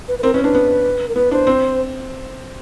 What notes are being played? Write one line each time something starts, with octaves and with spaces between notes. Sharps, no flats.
B4
B4
C4 A#4
C#4 B4
D4 B4
B3
A#4
B3 B4
D4 C5
C4